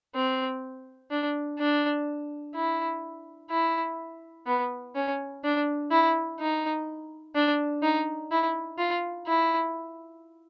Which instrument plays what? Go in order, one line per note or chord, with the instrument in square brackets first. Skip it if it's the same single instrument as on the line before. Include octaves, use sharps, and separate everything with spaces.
[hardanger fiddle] C4
D4
D4
E4
E4
B3
C#4
D4
E4
D#4
D4
D#4
E4
F4
E4